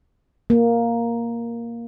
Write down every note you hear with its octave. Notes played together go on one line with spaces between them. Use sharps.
A#3